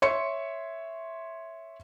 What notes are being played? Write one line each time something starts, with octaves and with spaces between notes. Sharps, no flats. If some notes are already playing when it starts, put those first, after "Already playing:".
C#5 E5 C6 C#7